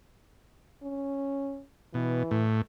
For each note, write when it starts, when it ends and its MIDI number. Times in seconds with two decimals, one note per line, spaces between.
0.83 1.62 61
1.94 2.23 47
1.94 2.43 52
2.31 2.61 45